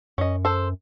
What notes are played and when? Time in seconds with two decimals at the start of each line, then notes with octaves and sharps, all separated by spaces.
0.18 F#2 C#4 D#5
0.45 A4 C5